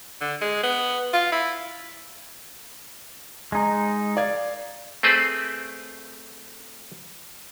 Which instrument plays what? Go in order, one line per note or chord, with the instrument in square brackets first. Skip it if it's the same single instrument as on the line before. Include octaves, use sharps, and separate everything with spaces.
[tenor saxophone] D3
G#3
B3
F4
E4
[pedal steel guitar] G#3 D#4
[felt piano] D5 F5 G#6
[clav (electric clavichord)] A3 C4 G#4 B4 C5 D5